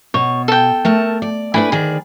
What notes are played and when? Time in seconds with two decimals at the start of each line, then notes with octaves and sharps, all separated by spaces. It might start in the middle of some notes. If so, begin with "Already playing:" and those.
0.14 B2 C#5
0.48 A4 G5
0.85 A3 A#4 A5
1.22 D5
1.54 A3 D4 E4 B4 G#5 B5
1.72 D2 D#3 G#4 D5